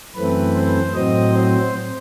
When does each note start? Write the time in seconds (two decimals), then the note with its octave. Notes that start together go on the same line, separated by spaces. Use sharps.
0.16 F#2 E3 A3 C4 B4
0.54 C5
0.93 A2 F#3 C4 D#5
1.33 C5